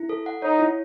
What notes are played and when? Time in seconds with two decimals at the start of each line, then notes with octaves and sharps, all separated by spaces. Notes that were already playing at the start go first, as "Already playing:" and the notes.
Already playing: E4
0.09 A4
0.26 F#5
0.42 D#4 C#5
0.59 E4